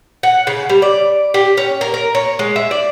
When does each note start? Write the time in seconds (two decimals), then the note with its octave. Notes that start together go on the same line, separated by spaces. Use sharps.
0.23 F#5
0.47 C#3
0.69 G3
0.82 D5
1.34 G4
1.57 C#4
1.81 A#4
1.94 A#4
2.15 C#5
2.39 G#3
2.56 E5
2.71 D5